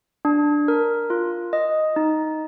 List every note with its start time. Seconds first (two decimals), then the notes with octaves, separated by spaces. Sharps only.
0.25 D4
0.68 A#4
1.10 F4
1.53 D#5
1.96 D#4